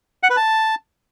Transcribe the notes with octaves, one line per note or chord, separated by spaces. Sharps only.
F#5
B4
A5